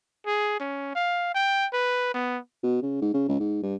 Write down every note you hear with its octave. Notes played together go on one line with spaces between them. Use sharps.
G#4
C#4
F5
G5
B4
B3
B2
C#3
G#2
C#3
C#2
G#2
G2